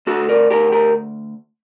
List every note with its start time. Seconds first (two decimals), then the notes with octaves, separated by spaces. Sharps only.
0.07 D2 F#4 A4
0.29 A#4 D5
0.50 D2 G4 A#4
0.72 G4 A#4